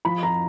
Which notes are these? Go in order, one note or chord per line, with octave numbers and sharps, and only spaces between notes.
F3 B5
F2 A#5